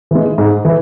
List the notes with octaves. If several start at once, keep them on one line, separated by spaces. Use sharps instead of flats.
E3 G#3
G#2
E3